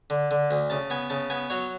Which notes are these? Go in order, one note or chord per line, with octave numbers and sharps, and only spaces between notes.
D3
D3
D2
C#3 A5
B3 G#5
C#3 A5
B3 G#5
F#3 C#5